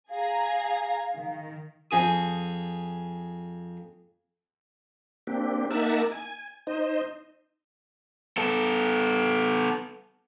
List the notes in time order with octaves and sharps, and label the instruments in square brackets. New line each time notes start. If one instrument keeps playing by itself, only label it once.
[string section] G#4 G#5 A#5 [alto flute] F5
[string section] D#3
[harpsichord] F2 G#4 D#6
[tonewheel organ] A#3 C4 D4 G4
A#3 D#4 A#4 E5 F#5 A5
G#5
D#4 C5 D#5
[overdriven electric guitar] B3 A4